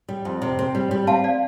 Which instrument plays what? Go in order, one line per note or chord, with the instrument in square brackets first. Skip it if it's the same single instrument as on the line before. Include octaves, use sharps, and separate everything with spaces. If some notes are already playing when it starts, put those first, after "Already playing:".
[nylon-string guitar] G3
F2
C3
C4
G3
G3
[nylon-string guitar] C4 [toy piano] F5 A5
[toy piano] D5 F5